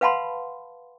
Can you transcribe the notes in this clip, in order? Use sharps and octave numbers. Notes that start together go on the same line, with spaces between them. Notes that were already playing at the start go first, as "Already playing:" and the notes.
B4 F5 F#5 A5 B5 C6